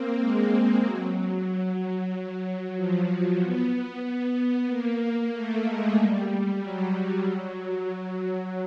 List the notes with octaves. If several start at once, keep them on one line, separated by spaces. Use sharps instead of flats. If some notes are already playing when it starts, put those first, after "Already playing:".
Already playing: A#3 C4
G#3
F#3
F3
F3
B3
B3
A#3
A3
G#3
G3
F#3
F#3